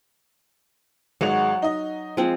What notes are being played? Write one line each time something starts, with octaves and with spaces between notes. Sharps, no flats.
G#1 F#3 G#3 F#4 F7
D#4 D#5
F3 G#3 C4